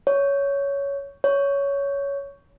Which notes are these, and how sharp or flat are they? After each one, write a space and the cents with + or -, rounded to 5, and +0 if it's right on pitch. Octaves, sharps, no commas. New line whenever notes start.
C#5 +10
C#5 +15